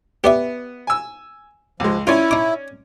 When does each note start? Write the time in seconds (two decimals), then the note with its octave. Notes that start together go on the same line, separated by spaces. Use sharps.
0.24 B3 G4 D5 E5
0.87 G#5 E6
1.80 C#2 F3 G#3
2.07 C#4 E4 F4 C#5 D5
2.31 D#4 D6